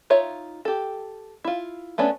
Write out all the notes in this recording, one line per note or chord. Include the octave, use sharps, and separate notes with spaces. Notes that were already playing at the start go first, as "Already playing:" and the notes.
D#4 F4 C#5 E5
G4 A4
E4 F4
A3 B3 C#4 D4